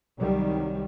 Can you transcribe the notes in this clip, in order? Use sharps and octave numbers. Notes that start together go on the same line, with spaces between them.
C2 D#3 F#3 G3